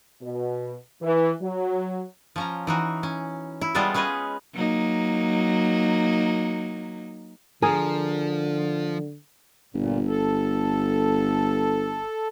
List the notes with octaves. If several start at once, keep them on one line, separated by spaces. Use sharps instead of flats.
B2
E3
F#3
F3 C#4 A#5
E3 D#4 F#4
C#4
E4
G3 G#3 B3 F4 A4 E5
C#4 G#4 B4 C#5 D#5
F#3 A#3 D#4
D3 F3 G#4 A#4
G1 A#2
A4